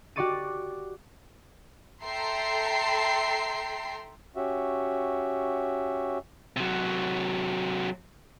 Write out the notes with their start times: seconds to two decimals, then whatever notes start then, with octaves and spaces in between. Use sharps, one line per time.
0.16 F#4 G4 D5 C#6 A6 D#7
2.03 A4 E5 G5 A#5 C6 C7
4.36 C#4 F#4 G4 E5
6.57 C3 F#3